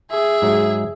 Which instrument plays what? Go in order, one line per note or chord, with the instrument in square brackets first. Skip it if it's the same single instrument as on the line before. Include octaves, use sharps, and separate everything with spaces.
[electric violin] G#4 E5
[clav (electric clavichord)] G#2 F#3 G#3